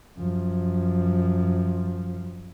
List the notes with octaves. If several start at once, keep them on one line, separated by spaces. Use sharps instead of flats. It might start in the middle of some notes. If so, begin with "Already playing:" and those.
F#2 F3